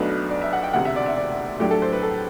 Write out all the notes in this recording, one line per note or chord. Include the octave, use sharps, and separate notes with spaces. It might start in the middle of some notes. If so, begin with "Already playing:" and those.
Already playing: B1 B2 F#3 A3 D4 B4
D5
E5
F#5
G5
E1 D2 C3 F#5
E5
D5
E5
D5
A2 F#3 A3 D4 G4
A4
C5
B4
A4